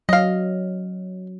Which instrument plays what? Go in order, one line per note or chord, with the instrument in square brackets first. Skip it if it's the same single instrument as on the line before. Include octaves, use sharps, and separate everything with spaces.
[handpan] F#3 [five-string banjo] D#5 F5